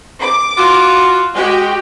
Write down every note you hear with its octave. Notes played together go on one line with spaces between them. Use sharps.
D6
F4 F#4
G#3 F#4 G4 G5